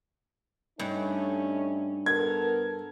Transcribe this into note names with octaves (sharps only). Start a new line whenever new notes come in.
G2 A3 C#4 D#4
B3 A4 A#4 G#6